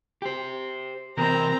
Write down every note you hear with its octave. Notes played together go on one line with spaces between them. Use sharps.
G4 C5
C3 E3 C4 A#4 A#5